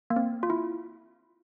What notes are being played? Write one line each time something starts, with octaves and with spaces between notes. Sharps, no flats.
A#3
C4
F4
E4